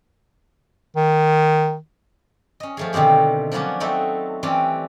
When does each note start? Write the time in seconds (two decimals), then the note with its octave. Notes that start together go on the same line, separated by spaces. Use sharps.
0.96 D#3
2.60 C#4 D#5
2.77 F3 A3 G#4
2.93 B2 D3 D#3 C4 G4
3.52 F3 F#3 A#3 B3 C#4 D4
3.80 F#3 A3 C4 D#4 F#4 A4
4.43 E3 G3 C4 C#4 G4 D5